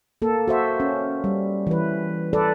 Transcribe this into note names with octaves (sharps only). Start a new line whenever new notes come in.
A#3 A4
F#4 C5 E5
C#4
G3
E3 B4
A4 B4 D5